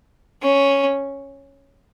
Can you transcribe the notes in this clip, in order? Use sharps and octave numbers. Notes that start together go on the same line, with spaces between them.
C#4